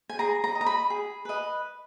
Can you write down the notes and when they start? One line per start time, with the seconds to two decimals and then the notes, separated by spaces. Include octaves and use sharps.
0.09 G#5
0.19 G#4 A#5
0.44 A#5
0.55 D#5
0.61 A#5
0.66 B5
0.90 G#4
1.25 B4 D#5